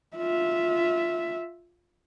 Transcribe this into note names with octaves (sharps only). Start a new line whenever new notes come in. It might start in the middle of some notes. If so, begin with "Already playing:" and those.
F4 E5